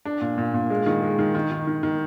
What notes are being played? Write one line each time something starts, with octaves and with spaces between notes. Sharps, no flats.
D4
A#2
A#2
A#2
G#3
D#3
G#3
D#3
D#3
D#3
D#3
D#3